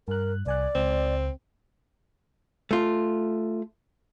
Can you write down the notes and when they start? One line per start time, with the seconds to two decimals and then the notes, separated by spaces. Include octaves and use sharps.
0.08 G2 A#4 F#6
0.46 C2 D5 G#5 F#6
0.75 C#2 C4
2.71 A3 F4